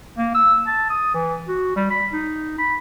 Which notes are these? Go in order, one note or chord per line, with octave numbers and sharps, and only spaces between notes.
A#3
E6
A5
D#6
E3
F#4
G3
B5
D#4
B5